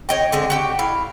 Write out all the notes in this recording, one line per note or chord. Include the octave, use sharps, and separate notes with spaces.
C#5 D#5 G5
D3 G#3 C4 D4
F#4 G4 G5
E4 F5